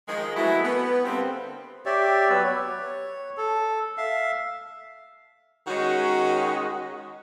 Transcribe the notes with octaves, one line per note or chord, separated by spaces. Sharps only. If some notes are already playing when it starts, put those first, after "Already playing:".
D#3 F3 G#3
F#3 G#3 A3 B3 E4 F#4
B3
D3 G3 A#3 C4
G4 C#5 D5 E5
F#3 B3 B4 E6
C#5
A4
E5 F5
D#3 G#3 C#4 F#4 C#5 D#5